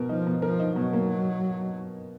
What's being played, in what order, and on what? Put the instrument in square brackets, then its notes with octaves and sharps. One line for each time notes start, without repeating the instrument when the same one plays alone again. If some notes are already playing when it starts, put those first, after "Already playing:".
Already playing: [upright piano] B2 A#4
[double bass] F3 [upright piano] D#4
[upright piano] B2
[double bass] F3 [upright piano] A#4
[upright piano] D#4
[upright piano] B2 [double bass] F#3
[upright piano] A#3